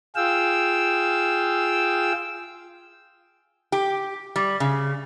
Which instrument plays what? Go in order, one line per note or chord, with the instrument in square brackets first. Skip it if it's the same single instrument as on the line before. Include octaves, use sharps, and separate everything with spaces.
[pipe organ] F4 G#4 F5 G5 E6
[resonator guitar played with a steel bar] G4
G3
C#3